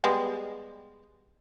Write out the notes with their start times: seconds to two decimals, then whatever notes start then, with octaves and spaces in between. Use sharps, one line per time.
0.04 G3 G#3 B3